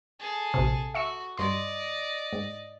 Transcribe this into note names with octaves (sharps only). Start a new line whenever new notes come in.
G#4 A4
A#1 C3
F#4 E5 C#6 E6
G2 D5 D#5 C6
G#2